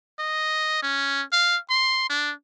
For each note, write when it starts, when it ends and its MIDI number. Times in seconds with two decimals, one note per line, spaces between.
0.19 0.81 75
0.82 1.22 61
1.32 1.57 77
1.70 2.06 84
2.09 2.32 62